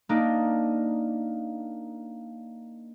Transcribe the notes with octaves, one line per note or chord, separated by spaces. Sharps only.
A#3 D4 D#4